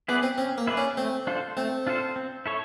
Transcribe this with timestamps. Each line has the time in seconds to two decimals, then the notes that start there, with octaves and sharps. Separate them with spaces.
0.08 B3 E4 G#4 B4 D5
0.23 C4
0.38 C4 C#4
0.58 A#3
0.67 E4 G#4 B4 D5
0.77 C#4
0.97 A3 C4
1.27 D4 F4 A4 C5
1.57 A3 C4
1.87 D4 F4 A4 C5
2.16 C4
2.46 E4 A4 C#5